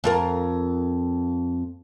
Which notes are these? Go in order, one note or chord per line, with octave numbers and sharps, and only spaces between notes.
F2 F4 A#4